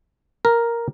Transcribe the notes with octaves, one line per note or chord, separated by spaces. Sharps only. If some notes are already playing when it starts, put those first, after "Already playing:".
A#4